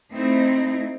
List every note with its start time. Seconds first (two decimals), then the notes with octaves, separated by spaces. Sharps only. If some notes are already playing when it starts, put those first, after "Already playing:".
0.13 A3 C4 D#4 E4